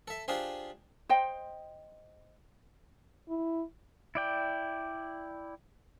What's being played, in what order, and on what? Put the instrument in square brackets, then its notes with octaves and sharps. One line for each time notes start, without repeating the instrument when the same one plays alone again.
[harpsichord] A4 E5
D4 F4 G4 G#4 C5
[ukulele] C5 D#5 G5
[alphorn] E4
[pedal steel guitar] E4 D5 G5